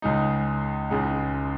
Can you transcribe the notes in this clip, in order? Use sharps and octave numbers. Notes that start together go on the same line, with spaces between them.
C#2 C#3 G#3 D#4
C#2 C#3 G#3 D#4